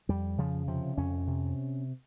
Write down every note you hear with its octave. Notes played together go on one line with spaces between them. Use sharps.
F2 G3
C#3 F3
C3 F3
F2 C#4
C3